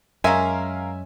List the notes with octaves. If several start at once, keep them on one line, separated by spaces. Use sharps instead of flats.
F#2 G#3 C#4 A#4 E5 F5 G#5 A#5